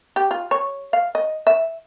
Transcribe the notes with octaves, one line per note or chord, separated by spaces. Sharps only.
G4
F4
C#5
F5
D#5
E5